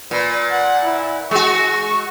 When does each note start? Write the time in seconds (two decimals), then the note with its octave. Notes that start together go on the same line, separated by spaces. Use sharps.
0.11 A#2 B4
0.51 F#5
0.84 E4
1.31 G#3 F#4 C#6